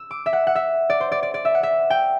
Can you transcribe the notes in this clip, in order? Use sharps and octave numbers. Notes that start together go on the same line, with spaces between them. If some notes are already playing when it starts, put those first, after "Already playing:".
Already playing: E6
D6
E5
F#5
F#5
E5
D5
C5
D5
D5
D5
E5
F#5
E5
G5